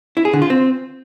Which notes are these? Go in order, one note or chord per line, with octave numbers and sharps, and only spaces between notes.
E4
G#4
D3
F4
C4